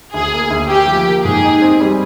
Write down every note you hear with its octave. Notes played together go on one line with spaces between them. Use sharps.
D2 G#4
A#3
D2
A#3 G4
F3
A#3
G#2 G#4
D#4
C4
G3